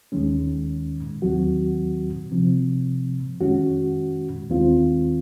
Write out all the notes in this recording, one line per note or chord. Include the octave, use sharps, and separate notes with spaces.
D#2 D#3 G#3 C#4
D#2 D#3 F#3 C4 F#4
C3 F3 C4
F2 D#3 G#3 C#4 F#4
D#2 D#3 G#3 C4 F4